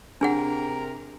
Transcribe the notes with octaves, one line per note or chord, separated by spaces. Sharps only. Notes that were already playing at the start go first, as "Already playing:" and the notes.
C3 D4 G#4 A#4 F#5